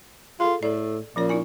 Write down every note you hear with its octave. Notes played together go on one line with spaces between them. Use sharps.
F4 G#4 A4
A2 A4 D5
A#2 F3 C#4 C#5
D#4 E4 G#5